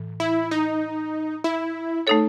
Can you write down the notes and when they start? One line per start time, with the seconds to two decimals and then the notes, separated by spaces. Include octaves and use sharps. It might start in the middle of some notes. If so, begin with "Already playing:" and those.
Already playing: A2 E3
0.20 E4
0.51 D#4
1.44 E4
2.07 A3 D#4 A4 C#5